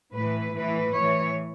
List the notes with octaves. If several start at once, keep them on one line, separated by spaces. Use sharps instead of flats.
A2 E3 B4
A2 E3 B4
A2 E3 C#5